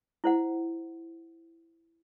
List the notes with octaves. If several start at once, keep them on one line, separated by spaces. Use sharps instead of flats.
E4 C5 F#5